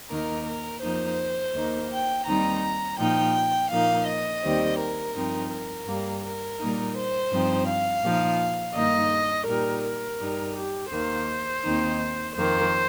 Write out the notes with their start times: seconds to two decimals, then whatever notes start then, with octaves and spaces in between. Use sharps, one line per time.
0.10 D#2 D#3 A#3 D#4 A#4
0.47 A#4
0.82 F2 F3 A#3 D#4 C5
1.54 D#2 D#3 A#3 D#4
1.90 G5
2.27 D#2 D#3 G3 C4 D#4 A#5
2.99 A#2 F3 D#4 G5
3.71 A#2 F3 A#3 D#4 F5
4.07 D#5
4.43 D#2 D#3 G3 C4
4.79 A#4
5.15 G2 F3 C4 D#4
5.51 A#4
5.87 G2 G3 A#3
6.24 A#4
6.59 A#2 G3 A#3 D#4
6.96 C5
7.32 G2 F3 C4 D#4
7.68 F5
8.04 A#2 F3 D#4
8.76 G2 D#3 A#3 D#4 D#5
9.47 A#2 G3 D#4 A#4
9.85 A#4
10.20 G2 G3 D#4
10.56 G4
10.92 D#2 D#3 A#3 C5
11.65 D#2 D#3 C4 D#4
12.36 F2 D#3 A#3 C5